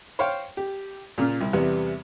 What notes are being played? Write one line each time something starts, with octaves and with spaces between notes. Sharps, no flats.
C5 C#5 F5 G5
G4
A#2 C#3 F4
C2
E2 C3 G3 B3